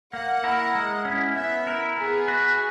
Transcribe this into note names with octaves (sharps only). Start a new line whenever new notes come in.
A#3 F#5
E4 A#4
G#3
C#4 E4
B3 E5
E4 A#4
B3 G#4
F#4 B4